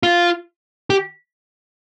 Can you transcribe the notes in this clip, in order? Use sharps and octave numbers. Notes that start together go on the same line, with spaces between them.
F4
G4